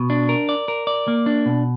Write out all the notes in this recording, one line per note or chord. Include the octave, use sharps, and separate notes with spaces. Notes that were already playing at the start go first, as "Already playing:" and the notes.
Already playing: B2
D4
A#4
D5
A#4
D5
A#3
D4
B2